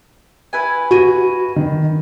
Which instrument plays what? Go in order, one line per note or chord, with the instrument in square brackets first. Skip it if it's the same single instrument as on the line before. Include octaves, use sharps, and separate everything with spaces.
[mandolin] E4 B4 G#5
[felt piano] F#4 D#7
D#3